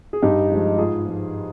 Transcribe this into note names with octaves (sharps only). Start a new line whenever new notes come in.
G#4
G2 D#4 G4
F3 G#3
G#2 F4 G#4
F3 G#3